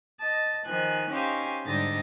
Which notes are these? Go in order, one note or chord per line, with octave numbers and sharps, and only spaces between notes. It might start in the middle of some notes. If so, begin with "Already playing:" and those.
D#5 A5
D#3 F3 D#4 G#5 F#6
C#4 D#4 G4 C5 F5 G#5
G#2 D3 G3 D#4 A6 A#6